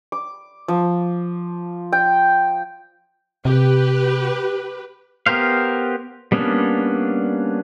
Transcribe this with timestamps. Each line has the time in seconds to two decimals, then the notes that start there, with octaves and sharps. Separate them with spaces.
0.12 D6
0.68 F3
1.93 G5
3.45 C3 G4 B4
5.26 B3 G4 A#4 C5 F5
6.32 G3 A#3 B3 C#4 D4